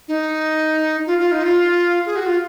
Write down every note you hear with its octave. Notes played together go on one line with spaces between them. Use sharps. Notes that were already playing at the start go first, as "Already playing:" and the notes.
D#4
F4
F4
D#4
F4
G#4
F#4
F4